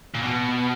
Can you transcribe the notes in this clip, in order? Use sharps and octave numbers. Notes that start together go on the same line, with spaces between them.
A#2
B2